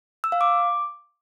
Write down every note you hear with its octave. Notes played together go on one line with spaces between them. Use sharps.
E6
F5
D6